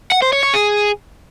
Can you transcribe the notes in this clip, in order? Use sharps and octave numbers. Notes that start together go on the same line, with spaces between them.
F#5
C5
C#5
C#5
G#4